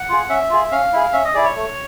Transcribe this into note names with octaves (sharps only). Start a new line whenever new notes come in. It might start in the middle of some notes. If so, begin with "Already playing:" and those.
Already playing: F#5
F4 G#4
C#4 E5
F4 G#4
C#4 F5
E4 G#4
C#4 E5
D#5
E4 G#4 D5
C#5
A3